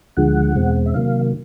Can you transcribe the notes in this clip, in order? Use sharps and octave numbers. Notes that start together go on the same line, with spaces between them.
D2 D3 F3 G#3 F#5
E2 B2 G#3 C4
E5
C3 D#3 F#3 A#3 F5